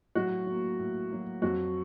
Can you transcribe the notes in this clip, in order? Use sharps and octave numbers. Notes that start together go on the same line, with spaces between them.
A2 F#3 F#4
F#3 A#3
A2
F#3 A#3
F2 F#3 F#4